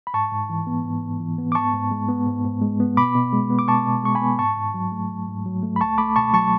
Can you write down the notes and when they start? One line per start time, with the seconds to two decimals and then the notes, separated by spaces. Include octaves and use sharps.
0.07 B5
0.14 G#2 A5 C#6
0.32 G#2
0.50 E3
0.67 B3
0.85 G#2
1.03 G#2
1.20 E3
1.38 B3
1.52 D6
1.55 G#2 A5 C#6
1.73 G#2
1.91 G#3
2.08 B3
2.27 G#2
2.45 G#2
2.62 G#3
2.80 B3
2.97 B2 B5 D6
3.15 B2
3.33 G#3
3.50 B3
3.59 D6
3.68 B2 A5 C#6
3.86 B2
4.04 G#3 C#6
4.15 G#5 B5
4.22 B3
4.39 G#2 A5 C#6
4.57 G#2
4.74 F#3
4.92 A3
5.10 G#2
5.28 G#2
5.46 F#3
5.63 A3
5.76 B5
5.80 C#2 A5 C#6
5.98 A3 B5 D6
6.16 B2 A5 C#6
6.33 F#3 A5 C#6